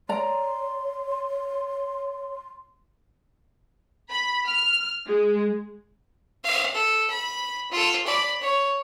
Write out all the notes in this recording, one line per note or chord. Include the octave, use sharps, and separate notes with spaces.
C#5 D5 A#5 C6
B5
F6
G#3
F5
A4
B5
F4 A4
D5 B5
C#5